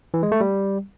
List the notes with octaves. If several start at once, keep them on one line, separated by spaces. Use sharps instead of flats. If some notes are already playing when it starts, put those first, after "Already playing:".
E3
G#3
A3
G3